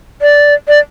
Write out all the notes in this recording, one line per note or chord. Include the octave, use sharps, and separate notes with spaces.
D5
D5